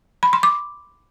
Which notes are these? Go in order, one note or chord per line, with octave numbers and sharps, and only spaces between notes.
B5
C6
D6